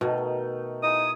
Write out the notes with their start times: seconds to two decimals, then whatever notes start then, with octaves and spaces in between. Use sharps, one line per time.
0.01 B2 D#3 A3
0.18 D#4
0.83 D#4 E4 G#4 D#6